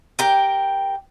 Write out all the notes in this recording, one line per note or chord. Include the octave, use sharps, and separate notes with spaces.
G4 A#4 G5